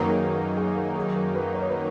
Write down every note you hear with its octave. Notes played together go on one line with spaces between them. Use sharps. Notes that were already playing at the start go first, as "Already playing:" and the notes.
Already playing: F#2 D#3 F#3 A#3 D#4 A#4 B4
G#4
B4
A#4
G#4
A#4
G#4
A#4
B4
C#5
B4